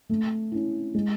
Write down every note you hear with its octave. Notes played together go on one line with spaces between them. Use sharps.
A3
C#4 E4
G#3